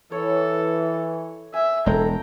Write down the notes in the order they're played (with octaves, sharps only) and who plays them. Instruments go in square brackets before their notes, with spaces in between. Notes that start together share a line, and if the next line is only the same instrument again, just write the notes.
[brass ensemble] E3 [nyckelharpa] A4 [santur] C#5
[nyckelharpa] E5 [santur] G#5
[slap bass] E1 G#3 [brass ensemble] A4 [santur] G5 [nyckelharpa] A#5